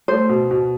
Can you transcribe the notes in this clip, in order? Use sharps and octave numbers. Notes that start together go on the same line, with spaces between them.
A3 C5
B2
B2